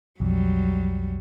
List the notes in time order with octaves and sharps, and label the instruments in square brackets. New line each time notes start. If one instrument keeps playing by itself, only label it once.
[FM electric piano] B1 F2 [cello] F#3 G3